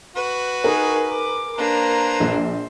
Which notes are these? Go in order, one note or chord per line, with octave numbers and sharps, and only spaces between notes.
F#4 B4
D#4 G#4 A#4
D6
A#3 D4 B4 C5 A#5
A#1